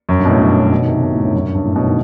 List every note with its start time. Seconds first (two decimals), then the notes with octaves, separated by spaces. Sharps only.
0.09 F#2
0.19 G2
0.25 B2
0.29 A2
0.40 G2
0.50 A2
0.61 B2
0.71 B2
0.81 D#3
0.87 C3
0.92 D#3
1.02 B2
1.13 A2
1.24 G2
1.34 F#2
1.44 G2
1.55 G2
1.65 A2
1.76 B2
1.86 D#3